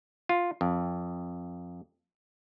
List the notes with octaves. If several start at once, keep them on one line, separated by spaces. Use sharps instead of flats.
F4
F2